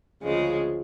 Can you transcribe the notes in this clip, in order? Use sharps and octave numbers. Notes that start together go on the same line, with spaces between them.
D2 C#3 F3 G#3